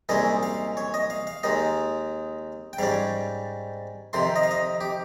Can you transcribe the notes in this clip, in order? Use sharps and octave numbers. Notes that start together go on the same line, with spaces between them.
C2 A#2 G#3 C#4 D#5
F5
C#5
D#5
F5
F5
D#2 D#3 G#3 D#5
G5
G#2 G3 C#4 F5
F2 C3 D#3 C6
D#5
F5
D#5
G4